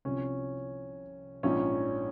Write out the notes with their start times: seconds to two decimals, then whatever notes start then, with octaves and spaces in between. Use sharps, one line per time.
0.05 C2 C3 F3 C#4
1.43 A#1 G#2 F3 C#4